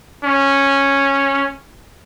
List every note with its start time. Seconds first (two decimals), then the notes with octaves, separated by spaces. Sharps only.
0.24 C#4